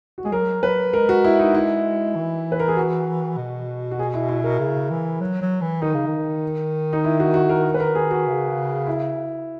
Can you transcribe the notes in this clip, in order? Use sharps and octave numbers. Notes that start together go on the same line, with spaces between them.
F#4
G#3 G#4
F#3 A#4
F#3 B4
G#3 A#4
F#4
E4
D#4
E4
E3
B4
A#4
G#4
F#4
B2
F#4
G#4
E4
E4
A#4
C#3
E3
F#3
F#3
E3
D#3 D#4
C#3
D#3
D#4
E4
F#4
F#4
A#4
B4
A#4
G#4
F#4
C#3
E4